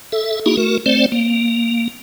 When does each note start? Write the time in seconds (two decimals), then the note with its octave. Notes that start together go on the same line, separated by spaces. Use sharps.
0.12 A4 E5
0.46 A#3 D#4 E4 F#4 G#4
0.57 A3 F#4 A#4
0.86 A3 C4 C5 D5
1.12 A#3